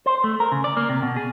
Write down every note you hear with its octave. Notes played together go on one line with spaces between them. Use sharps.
C5
A3
A#4
C#3
D5
A#3
C3
B2
G#4